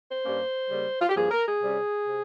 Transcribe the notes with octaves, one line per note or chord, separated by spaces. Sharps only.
C5
G2 G3 A#3 C#4
C#3 G3 A#3
F4
G4
G2 F3 A#3 G#4
A#4
G#4
C3 G3 C#4
C3